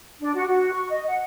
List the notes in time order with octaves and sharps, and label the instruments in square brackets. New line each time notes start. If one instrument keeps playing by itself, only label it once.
[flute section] D4
F#4
F#4
C#6
D#5
F#5